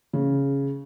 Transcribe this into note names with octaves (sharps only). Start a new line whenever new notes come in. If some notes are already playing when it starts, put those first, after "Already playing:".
C#3